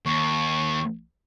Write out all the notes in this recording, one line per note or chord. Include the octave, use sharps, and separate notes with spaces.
D#2 C#6